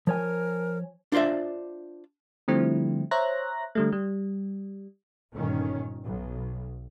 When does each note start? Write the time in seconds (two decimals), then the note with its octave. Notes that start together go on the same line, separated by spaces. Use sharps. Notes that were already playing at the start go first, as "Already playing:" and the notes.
0.07 F3 A#4 C#5 G#5
1.12 D4 F4 C5 D5 E5
2.48 D3 F3 G3 A3 C4 E4
3.11 C5 C#5 E5 A#5 F#6 A#6
3.75 D3 G3 A3
3.92 G3
5.32 G1 A#2 D#3 C#4
6.04 B1